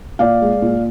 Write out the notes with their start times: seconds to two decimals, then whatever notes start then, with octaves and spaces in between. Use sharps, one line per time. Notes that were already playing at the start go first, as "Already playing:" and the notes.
0.19 A#2 D5 F5
0.42 G#3
0.62 A#2